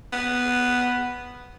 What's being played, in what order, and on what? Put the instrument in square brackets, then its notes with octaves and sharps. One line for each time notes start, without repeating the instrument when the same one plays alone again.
[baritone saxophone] B3